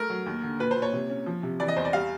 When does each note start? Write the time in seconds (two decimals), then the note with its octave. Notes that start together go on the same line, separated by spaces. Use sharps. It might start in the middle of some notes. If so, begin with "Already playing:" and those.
Already playing: A3 A#4
0.10 F#3
0.26 D#2
0.43 D3
0.60 A#2 B4
0.71 C5
0.76 A#2
0.82 C#5
0.93 C3
1.10 C#4
1.26 F3
1.43 C3
1.60 E3 D5
1.68 D#5
1.77 E2 C5
1.85 D5
1.93 G3 F5